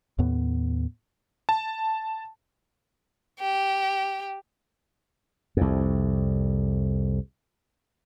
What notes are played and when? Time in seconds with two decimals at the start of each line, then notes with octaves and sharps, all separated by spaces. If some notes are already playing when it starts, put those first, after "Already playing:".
0.18 D#2 A2 B3
1.49 A5
3.40 G4
5.57 C2 F2